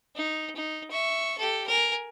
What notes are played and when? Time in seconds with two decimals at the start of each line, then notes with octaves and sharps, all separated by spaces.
0.16 D#4
0.56 D#4
0.91 E5 C#6
1.38 G4 A4
1.67 A#4 G#5